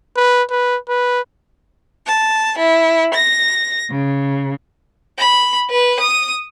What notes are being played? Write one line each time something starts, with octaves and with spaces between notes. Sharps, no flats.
B4
B4
B4
A5
E4
A#6
C#3
B5
B4
D#6